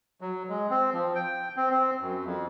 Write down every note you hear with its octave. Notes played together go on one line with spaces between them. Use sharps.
F#3
G#3
C4
F3
G5
C4
C4
F#2
F2